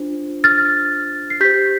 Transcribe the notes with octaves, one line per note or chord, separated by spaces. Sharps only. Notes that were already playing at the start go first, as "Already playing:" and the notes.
Already playing: D4 F4 C5
F6 A6
C7
G4 C5 G6 B6